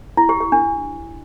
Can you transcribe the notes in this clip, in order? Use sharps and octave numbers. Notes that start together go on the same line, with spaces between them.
E4
G4
G4
D4